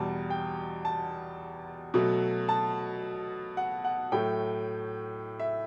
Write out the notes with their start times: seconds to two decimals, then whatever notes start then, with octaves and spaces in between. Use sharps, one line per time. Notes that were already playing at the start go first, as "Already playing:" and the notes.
Already playing: E2 B2 G3 A5
0.30 G5
0.85 A5
1.94 B2 F#3 A3
2.49 A5
3.57 F#5
3.85 F#5
4.12 A2 F#3 A3 G5
5.39 E5